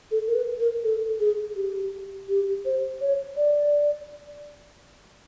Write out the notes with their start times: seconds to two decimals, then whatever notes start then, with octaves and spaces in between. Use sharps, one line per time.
0.11 A4
0.27 A#4
0.35 B4
0.60 A#4
0.84 A4
1.20 G#4
1.56 G4
2.29 G4
2.65 C5
3.01 C#5
3.36 D5